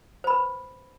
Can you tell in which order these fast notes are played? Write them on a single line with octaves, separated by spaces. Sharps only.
C5 B5 B4